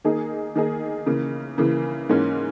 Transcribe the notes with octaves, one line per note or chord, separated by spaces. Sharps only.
D#3 A#3 D#4 G#4
D#3 A#3 D#4 G#4
C#3 E3 A#3
C#3 E3 A#3
G#2 E3 A#3 C#4